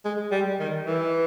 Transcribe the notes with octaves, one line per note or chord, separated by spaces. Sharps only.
G#3
G3
D#3
E3